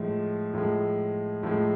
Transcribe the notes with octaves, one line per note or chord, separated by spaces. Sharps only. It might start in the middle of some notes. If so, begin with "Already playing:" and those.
Already playing: A2 F3 G#3
A2 F3 G#3
A2 F3 G#3